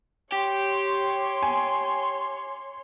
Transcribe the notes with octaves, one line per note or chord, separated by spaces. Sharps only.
G4 C#5 C6
G#5